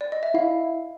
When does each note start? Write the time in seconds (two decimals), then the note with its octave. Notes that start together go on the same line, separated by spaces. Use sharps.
0.01 D5
0.12 D#5
0.23 E5
0.34 E4 F5